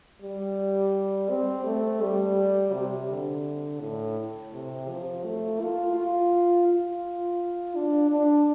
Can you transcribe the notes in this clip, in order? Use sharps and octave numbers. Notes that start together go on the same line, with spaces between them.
G3
C4
A3
G3
C3
D3
A2
C3
F3
A3
F4
F4
F4
D4
D4